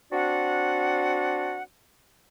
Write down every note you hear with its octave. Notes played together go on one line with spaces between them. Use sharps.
C4 D4 F#4 D5 F#5